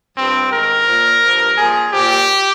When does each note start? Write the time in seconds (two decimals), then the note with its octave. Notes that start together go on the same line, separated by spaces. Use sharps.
0.17 G2 F3 C4
0.52 G#2 D#3 A#4
0.87 A#2 F3
1.23 G2 F3
1.57 A#2 F3 G#4
1.93 A#2 F3 G4